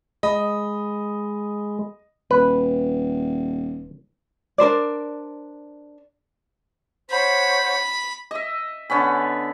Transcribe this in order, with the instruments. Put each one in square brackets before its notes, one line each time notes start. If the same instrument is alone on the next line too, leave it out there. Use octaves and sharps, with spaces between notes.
[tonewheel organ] G#3 [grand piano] D#5 [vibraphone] B5 D#6
[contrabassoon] D#1 [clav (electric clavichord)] B4
[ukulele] D4 A#4 C5 D5
[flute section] C5 C#5 F#5 [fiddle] B5
[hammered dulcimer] D#5 E5
D3 B3 C#4 B5